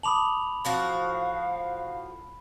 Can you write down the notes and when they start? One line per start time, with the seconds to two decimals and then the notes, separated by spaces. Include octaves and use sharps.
0.03 A5 B5 D6 D#6 F7 F#7
0.65 A2 F3 F#4 F5